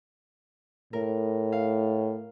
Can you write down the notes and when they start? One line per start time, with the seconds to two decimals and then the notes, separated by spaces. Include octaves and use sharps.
0.93 A2 A#4
1.52 F5